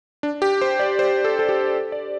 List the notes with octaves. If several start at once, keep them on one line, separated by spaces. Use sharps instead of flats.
D4
G4
C5
D5
C5
A4
A4
G4
D5